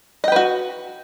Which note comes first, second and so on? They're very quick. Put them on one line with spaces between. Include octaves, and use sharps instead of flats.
D#5 G5 B4 F#4